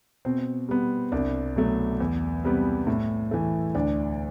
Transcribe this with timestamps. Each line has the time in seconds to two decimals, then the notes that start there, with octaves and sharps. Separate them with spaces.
0.25 B2 C4
0.68 G3 B3
1.12 C2 D4
1.56 B2 F#3 A3
2.00 E2
2.43 C3 G3 B3
2.87 A2
3.31 E3 A3
3.75 D2 D4